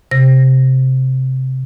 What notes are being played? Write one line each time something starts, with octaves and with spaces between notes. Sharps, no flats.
C3 A#6